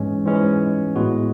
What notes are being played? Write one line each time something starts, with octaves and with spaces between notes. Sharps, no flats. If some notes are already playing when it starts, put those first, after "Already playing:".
Already playing: G#2 E3 G#3 C#4
G#2 E3 G#3 C#4
A2 G#3 B3 F#4